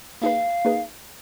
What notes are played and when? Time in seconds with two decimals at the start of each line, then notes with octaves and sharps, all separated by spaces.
0.22 A#3 D#4 G#4 B4 F5
0.65 A#3 D#4 G#4 B4